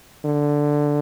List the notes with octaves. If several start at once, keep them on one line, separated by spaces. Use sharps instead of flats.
D3